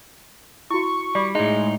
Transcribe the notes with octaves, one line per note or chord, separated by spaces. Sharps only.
E4 F#4 C#6
G3 D5 B5 D6
A2 G#3 D#4 D#5